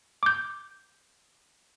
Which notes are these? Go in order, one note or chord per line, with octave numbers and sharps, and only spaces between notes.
D6 G6